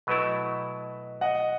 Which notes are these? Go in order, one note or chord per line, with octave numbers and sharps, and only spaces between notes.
B2 F#3 A3 E4 B4 D#5
D#5 F#5